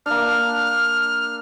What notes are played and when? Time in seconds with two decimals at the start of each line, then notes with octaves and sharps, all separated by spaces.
0.06 A#3 D4 F6